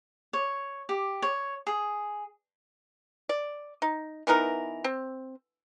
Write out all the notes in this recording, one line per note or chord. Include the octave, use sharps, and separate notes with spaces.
C#5
G4
C#5
G#4
D5
D#4
E3 B3 D#4 A#4
C4